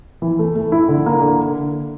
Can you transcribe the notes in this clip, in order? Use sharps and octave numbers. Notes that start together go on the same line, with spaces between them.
E3
A3
A3
E4
D3
A#3
D3